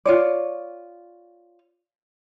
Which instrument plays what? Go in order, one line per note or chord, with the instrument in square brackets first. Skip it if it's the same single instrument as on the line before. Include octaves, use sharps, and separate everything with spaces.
[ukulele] F4 C#5 D5